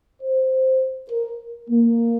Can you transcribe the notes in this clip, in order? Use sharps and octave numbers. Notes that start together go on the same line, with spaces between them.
C5
A#4
A#3